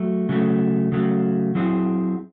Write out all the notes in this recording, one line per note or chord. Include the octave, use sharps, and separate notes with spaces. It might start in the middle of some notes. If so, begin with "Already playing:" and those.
Already playing: F#3 A3
C#3 F#3 A3
C#3 F#3 A3
F#3 C4 E4 G#4